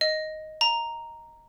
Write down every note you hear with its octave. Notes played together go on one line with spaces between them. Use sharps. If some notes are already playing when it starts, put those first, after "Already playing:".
D#5
A#5